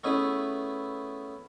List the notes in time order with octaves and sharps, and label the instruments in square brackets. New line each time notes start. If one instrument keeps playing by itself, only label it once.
[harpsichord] A3 B3 C#4 E4 G#4 B4